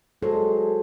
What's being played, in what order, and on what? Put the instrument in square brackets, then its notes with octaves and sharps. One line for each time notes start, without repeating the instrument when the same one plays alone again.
[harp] F#3 A#4 C5 [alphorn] G#3 [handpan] A4